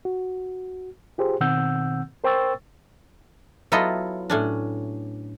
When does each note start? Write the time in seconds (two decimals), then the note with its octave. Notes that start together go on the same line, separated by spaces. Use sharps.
0.05 F#4
1.18 F4 G4 G#4 C5
1.40 B2 D#3 C4 F#5 E6 G6
2.24 A#4 C5 G5 C#6 E6 A6
3.72 F#3 B3 E4 F4 A4 D#5
4.30 A2 C#4 D4